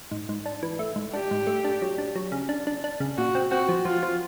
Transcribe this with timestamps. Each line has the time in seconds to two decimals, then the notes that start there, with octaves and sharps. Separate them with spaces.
0.11 G#2
0.29 G#2
0.46 D4
0.63 E3
0.79 A3
0.96 G#2
1.13 D4 G4
1.31 G#2
1.47 A3
1.64 D4
1.82 F#3
1.98 D4
2.16 F#3
2.32 C#3
2.49 D4
2.67 D4
2.84 D4
3.00 C#3
3.17 A#2 F#4
3.35 C4
3.51 C4 F#4
3.69 F3
3.85 F3 F4
4.03 F3